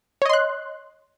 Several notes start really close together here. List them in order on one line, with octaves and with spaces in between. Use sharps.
C#5 D#5 C6 F#6